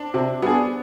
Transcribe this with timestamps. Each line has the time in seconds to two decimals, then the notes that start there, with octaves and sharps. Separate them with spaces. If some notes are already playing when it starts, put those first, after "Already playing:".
Already playing: C4 D4
0.14 C3 C4
0.42 G3 B3 D4 G#4